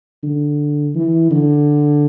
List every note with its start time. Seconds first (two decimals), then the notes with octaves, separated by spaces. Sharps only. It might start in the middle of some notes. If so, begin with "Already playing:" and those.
0.23 D3
0.95 E3
1.31 D3